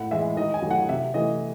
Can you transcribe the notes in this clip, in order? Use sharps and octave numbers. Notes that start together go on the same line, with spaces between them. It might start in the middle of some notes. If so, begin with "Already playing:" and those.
Already playing: A2 F#5
E3 G#3 E5
D#3 D#5
G#5
F#3 A3
F#5
C3 E5
E3 A3 D#5